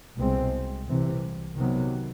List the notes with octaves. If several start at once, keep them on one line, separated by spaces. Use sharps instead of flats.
C2 B2 G#3 C4
C2 C3 E3
C3 D#3 F#3 B3